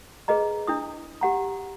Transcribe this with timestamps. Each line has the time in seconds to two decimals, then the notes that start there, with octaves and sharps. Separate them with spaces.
0.28 G#4 B4 D#5 A#5
0.67 D4 E4 D#6
1.21 G4 F#5 A#5